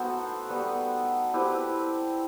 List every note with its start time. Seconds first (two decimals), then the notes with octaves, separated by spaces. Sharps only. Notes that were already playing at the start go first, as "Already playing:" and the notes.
Already playing: A3 B3 D#4 F#4 A4 C5
0.49 G3 B3 F#4
1.34 C4 E4 G4 B4